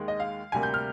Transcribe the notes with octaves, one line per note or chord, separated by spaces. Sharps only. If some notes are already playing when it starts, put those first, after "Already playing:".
Already playing: D#2 D#3 G#3
D#5
F5
D2 C3 G3 A#3 G#5
G6
F6